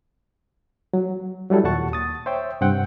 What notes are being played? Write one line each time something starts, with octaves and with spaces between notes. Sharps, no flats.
F#3
F#3 G3 E4 A4
D#2 A#2 F#5 A5 C#6
D#6 A6
C5 C#5 E5 G5
G2 C3 C4 F#5 G5